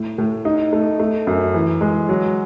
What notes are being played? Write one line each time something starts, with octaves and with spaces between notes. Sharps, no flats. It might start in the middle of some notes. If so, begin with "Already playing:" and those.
Already playing: A2
A2
D#4
A3
A3
F#2
E3
G#3
F#3